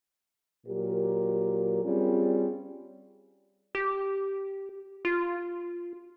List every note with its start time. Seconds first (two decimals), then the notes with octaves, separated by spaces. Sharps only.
0.67 A#2 F#3 G4 A#4
1.83 G3 C4 C#4 F4 G#4
3.75 G4
5.05 F4